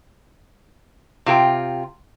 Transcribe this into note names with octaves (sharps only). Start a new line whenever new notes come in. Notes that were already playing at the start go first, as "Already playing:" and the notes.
C3 F4 G4 G5